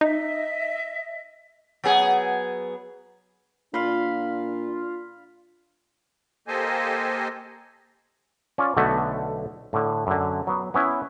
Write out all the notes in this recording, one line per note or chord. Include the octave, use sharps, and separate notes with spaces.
D#4 D#5 E5
F#3 B3 G#4
A#2 D4 F4 F5 B5 C6
A#3 G4 A4 C5 D#5 G#5
C#4 F4 D5
B1 D3 A3 B3 F#4
A2 D3
F#2 D3
F#3 B3
B3 C#4 E4